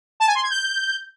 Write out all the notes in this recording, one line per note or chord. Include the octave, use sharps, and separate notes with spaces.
A5
G#5
C6
G#6
G6